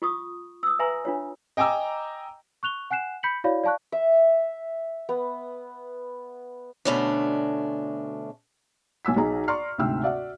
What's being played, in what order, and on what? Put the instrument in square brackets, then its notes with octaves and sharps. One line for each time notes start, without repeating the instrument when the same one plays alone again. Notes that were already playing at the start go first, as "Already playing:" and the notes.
[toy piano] F4 C#6 D#6
D#6 E6
B4 E5 G#5 A#5 C6
D4 F4 C#5
[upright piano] D#5 G5 G#5 A#5 D6 E6
[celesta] C#6 F#6 F7 G7
F#5 G#5 F#6 C7 E7
B5 G6 B6 C#7 F#7
E4 F#4 C#5 D5 F5 B5
D5 F5 A5 C#6 F#6
[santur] E5
B3
[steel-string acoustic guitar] D2 G#2 B2 A3 C#4 D4
[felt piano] B1 G#5 E6 B6
B1 D#4 G#4 A#5
D5 A#5 C6 C#6 F6 C7
D2 G#2 C3 G5 E6 F6
F#4 D5 E5 F#5